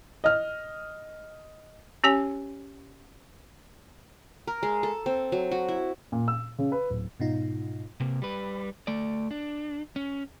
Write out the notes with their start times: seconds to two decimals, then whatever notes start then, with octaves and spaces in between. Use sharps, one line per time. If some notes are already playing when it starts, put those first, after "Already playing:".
0.24 D#5 F6
2.04 C#4 G4 C#5 G#5
4.47 A#4
4.63 G#3
4.83 A4
5.06 C4
5.32 F#3
5.51 F#4
5.68 E4
6.12 A#2
6.28 E6
6.58 C#3
6.72 B4
6.90 D1
7.20 G#2 B2 D#4 F4
8.00 C3 A#3
8.22 G3 B4
8.87 A3 D5
9.31 D4
9.96 C#4